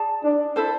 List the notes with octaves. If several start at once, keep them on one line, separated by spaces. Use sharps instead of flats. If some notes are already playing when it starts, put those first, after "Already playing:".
Already playing: G#4 D5 A5
D4
E4 A4 C5